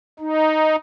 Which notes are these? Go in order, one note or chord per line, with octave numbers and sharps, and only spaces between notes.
D#4